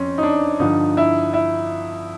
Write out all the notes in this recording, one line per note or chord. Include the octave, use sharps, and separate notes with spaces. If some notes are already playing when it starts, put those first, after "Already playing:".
Already playing: F2 C4 C#4
D#4
D4
G2 D3 F3 D#4
E4
E4